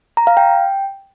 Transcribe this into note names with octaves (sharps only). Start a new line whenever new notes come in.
A#5
F5
G5